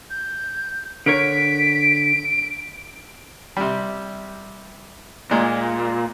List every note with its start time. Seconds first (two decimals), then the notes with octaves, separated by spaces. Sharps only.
0.10 G6
1.06 D3 A#4 C#5 B6 D7
3.57 C3 G3
5.31 A#2 G#3